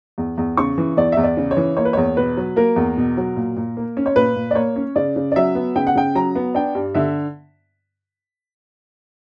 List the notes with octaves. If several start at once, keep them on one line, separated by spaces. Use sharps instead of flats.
E2
E2
C#3 C#6
E3
E2 D5
E2 E5
D5
C#3
C#5
E3
A#3 C#5
B4
E2 C#5
B2 B4
F#3
A#3 A#4
E2
B2
F#3
A#2
A#2
A#3
C#4
C#5
A#2 B4
A#2
D5
A#3 C#5
C#4
C#3 D5
C#3
D5
F#3 E5
B3
C#3 G5
F#5
C#3 G5
F#3 A#5
B3
D4 G5
G2
D3 E5